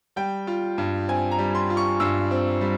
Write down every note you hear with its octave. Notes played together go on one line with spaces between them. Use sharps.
G3 G5
F4
G2
C4 G#5
A#5
G3
C6
F4
C#6
G2 E6
C4
G3